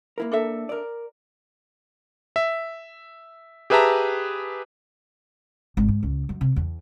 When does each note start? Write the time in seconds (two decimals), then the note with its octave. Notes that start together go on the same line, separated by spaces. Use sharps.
0.18 A#3 E4 A#4
0.32 D4 A4 E5
0.69 A#4 D5
2.36 E5
3.70 G4 G#4 B4 E5 A5 A#5
5.77 G#1
5.88 G#2
6.03 C#2
6.29 F#2
6.41 C3
6.56 E2